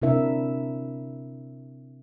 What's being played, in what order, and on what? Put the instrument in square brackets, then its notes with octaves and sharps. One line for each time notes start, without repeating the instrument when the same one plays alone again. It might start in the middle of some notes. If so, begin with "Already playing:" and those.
[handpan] C3 C4 D4 E4 A#4 E5